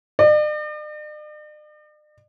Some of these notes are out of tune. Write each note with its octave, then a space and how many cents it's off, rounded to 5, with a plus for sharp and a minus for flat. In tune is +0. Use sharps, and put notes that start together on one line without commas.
D5 +45